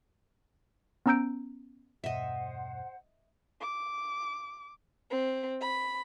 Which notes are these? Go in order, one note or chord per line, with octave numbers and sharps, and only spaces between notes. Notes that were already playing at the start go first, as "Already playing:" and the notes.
B3 C#4 A#5 E6 G6 D7
E2 G2 B2 C5 D#5 E5 F#5
D6
C4
B5